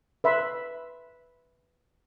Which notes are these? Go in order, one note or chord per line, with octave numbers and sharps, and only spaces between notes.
B4 E5 B5 C6